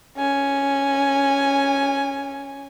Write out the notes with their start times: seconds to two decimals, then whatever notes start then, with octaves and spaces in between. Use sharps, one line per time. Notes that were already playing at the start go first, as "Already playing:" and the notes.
0.17 C#4 G#5